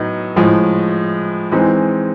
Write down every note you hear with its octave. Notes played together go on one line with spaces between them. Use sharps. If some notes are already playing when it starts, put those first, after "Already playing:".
Already playing: A2 F#3 B3 D#4
A2 F3 G#3
E3 G#3 C4 D#4